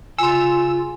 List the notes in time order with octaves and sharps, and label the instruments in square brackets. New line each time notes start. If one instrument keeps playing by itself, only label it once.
[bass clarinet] C#3 [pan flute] F4 [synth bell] G#5 C6 [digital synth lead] E6